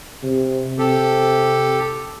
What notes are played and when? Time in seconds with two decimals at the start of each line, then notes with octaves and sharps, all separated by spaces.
0.23 C3
0.78 C3 G4 A4